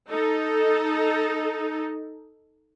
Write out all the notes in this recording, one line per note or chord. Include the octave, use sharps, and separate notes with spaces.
D#4 A4